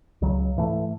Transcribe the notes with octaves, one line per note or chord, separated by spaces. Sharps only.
C#2 C#3 F#3
G#2 E3 A3